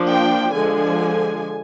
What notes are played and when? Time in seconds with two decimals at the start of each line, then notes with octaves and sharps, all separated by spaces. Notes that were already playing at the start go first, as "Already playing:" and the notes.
Already playing: F3 A#3 D4
0.10 G5
0.54 D3 F3 G#3 G#5